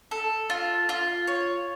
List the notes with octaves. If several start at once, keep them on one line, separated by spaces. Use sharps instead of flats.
A4
F4
F4
C#5